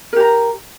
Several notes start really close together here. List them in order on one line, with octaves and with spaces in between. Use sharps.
A#4 G4 A#5